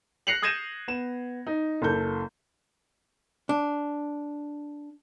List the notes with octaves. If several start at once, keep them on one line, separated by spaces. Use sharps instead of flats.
F#6 A#6 C7 C#7 F7 F#7
D#6 G6 G#6 A#6 D#7 E7
B3 E7
D#4
F#1 A4 G6
D4